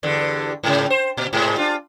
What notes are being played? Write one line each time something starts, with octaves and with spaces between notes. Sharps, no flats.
E2 G2 D3
G#2 C#3
C5
A#2
G#2 C3 G#3
D4 F4